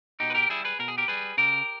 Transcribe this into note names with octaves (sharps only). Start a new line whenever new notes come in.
B2 D#4 G4
B4
G4 A#4
G3 E4 G#4
G#4 B4
B2 A#4
G#4
G4 A#4
G3 G#4 B4
C#3 G4 A#4